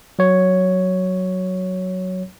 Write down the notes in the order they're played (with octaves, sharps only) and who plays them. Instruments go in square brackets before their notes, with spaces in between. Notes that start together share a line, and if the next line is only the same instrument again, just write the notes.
[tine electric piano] F#3 C#5